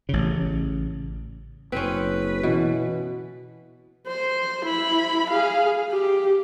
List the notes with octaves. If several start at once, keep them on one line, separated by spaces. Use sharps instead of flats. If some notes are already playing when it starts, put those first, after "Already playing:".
A1 C#3
F#1 C4 C#4 B4
B2 E3
C5
E4 B5
G#4 F5
G4